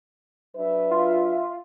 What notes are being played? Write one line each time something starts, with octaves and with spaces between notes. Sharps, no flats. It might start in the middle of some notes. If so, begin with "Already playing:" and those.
F#3 D4 B4 E5
F4